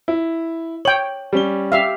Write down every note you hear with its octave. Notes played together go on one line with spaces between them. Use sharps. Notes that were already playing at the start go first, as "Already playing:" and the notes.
E4
C#5 G5 F#7
G3 C#4 G7
G4 E5 F5